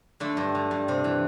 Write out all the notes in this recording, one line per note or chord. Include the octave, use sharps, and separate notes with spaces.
D3 A3
G2
D3
G2
C3
E3